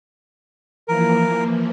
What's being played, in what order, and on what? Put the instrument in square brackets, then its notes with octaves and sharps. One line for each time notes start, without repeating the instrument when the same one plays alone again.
[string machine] E3 F3 A#3 [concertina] A#4